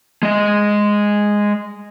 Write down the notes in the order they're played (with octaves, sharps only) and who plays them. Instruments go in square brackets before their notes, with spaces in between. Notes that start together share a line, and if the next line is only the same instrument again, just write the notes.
[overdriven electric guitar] G#3 D#5